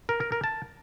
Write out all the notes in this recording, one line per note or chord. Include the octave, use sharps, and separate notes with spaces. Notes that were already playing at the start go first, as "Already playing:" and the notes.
A#4
A#4
A#4
A5